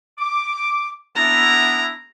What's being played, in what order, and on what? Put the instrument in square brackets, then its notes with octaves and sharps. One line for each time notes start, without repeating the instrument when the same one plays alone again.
[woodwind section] D6
[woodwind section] B3 D4 E4 [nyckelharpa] A#5